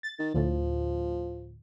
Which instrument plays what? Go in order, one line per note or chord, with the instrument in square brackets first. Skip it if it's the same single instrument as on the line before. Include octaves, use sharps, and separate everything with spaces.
[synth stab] A6
[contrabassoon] D#3
[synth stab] D2 A2 [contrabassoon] F3